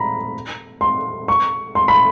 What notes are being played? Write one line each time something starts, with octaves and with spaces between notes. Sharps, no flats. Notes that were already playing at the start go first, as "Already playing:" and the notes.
Already playing: A#5 B5
C6
C#6
C6
B5